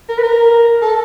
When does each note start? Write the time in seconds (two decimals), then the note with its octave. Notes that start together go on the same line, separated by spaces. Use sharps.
0.09 A#4
0.18 B4
0.23 A#4
0.82 A4